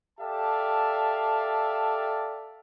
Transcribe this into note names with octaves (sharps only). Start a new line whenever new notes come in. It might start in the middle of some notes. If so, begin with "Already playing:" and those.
G4 A4 D5 E5 F5 A5